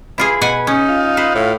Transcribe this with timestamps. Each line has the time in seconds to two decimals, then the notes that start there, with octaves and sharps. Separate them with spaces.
0.18 E4 F4 G#4 B4
0.41 B2 F#5 G#5
0.67 C#4 D#4
0.89 F4 F5
1.17 B4 C5
1.35 A2